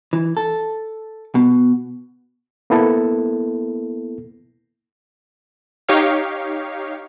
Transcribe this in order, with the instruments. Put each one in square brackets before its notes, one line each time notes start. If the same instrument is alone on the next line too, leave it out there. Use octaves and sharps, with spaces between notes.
[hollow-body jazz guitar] E3
A4
B2
[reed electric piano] A#3 B3 E4 A4
[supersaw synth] D#4 G4 C#5 F5